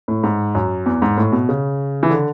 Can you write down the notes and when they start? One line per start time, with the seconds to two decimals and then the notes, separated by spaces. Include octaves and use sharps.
0.08 A2
0.23 G#2
0.55 F#2
0.86 E2
1.02 G#2
1.17 A2
1.32 B2
1.49 C#3
2.03 E3
2.10 D3